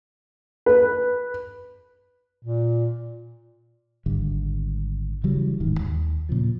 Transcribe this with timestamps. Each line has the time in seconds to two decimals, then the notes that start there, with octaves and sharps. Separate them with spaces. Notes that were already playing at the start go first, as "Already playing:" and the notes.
0.66 B4
2.43 A#2
4.06 G#1 D3 G3
5.24 C#3 E3 F#3 G3
5.60 D1 G#2 D#3
5.80 D#2
6.29 A#2 C#3 F3